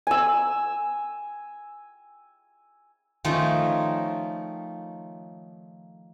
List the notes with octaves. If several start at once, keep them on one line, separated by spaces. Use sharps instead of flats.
G#5 E6
D#3 F3 A3 C#4 D#4 F4